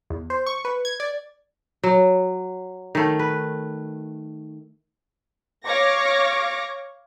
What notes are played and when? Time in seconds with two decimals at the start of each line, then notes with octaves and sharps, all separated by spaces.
0.10 E2
0.30 C5
0.46 C#6
0.65 B4
0.85 G#6
1.00 D5
1.84 F#3
2.95 D#3 A3
3.19 B4
5.64 C#5 F5 C#6 D6 A#6